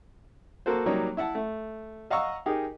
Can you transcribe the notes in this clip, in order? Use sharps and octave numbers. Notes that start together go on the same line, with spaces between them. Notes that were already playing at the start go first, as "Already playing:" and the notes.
A#3 F#4 A4 C5
F#3 G3 A#3 D#4 C#5
E4 E5 F#5 A5
A3
D#5 F5 F#5 A#5 C#6 E6
D#4 G4 G#4 A#4